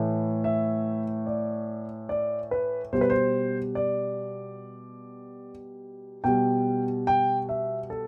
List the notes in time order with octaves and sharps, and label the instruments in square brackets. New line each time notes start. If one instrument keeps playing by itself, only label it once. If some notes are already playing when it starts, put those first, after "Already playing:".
Already playing: [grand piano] A2 E3 A3
E5
D5
D5
B4
B2 G3 C5
B4
C5
D5
B2 G3 G5
G5
E5
A4